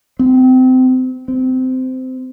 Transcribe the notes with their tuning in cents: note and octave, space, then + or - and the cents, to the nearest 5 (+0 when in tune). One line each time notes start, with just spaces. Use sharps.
C4 -30
C4 -20